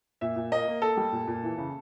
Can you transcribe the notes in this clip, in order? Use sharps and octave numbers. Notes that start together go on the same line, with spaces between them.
A#2 E5
A#2
A#3 D#5
A#3
A#3 A4
G3
A#2
A#2
E3
C#3